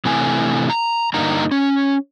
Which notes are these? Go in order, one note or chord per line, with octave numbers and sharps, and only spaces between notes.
C3 E3 A3 G#5
A#5
G2 D3 A#3 D#4 A#5
C#4